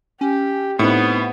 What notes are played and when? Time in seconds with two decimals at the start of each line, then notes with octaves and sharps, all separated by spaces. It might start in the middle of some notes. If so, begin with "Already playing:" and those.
0.21 C#4 G4
0.79 A2 B3 C4 D#4 F#5